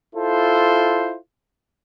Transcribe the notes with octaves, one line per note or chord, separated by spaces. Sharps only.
E4 F4 A4 C5